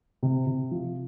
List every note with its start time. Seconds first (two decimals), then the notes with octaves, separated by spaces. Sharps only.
0.23 C3
0.47 C3
0.71 F3